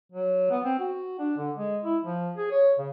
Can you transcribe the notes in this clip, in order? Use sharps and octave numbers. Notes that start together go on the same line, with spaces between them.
F#3
B3
C4
F#4
D4
D3
G#3
E4
F3
G#4
C#5
C#3